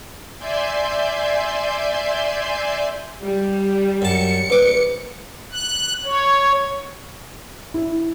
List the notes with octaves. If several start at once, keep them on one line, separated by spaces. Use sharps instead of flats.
D5 E5 G#5 C6 G6
G3
F#2 A5 C#7
A#1 B4 D6
F#6
C#5
E4